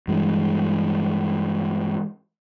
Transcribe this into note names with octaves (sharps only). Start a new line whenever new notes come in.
G2 E3 G#3